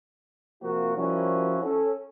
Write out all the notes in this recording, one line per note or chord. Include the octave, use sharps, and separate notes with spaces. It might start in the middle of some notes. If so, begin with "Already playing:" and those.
C3 F3 A#3 F4 F#4 A#4
F3 G3 C#4 E4 F#4 A#4
C#4 A4